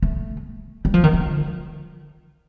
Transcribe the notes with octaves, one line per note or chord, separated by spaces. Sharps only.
A3
G3
F3
D#3
D3